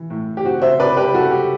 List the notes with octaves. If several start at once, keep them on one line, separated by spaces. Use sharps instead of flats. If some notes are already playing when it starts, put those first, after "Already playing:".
Already playing: E3
A2
G4
C4 F#4
C5 E5
C3 B4 D5
G4 B4
G3 F#4 A4
G4